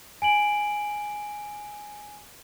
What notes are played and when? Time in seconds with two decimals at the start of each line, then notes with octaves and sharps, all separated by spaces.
0.22 G#5 D7 F#7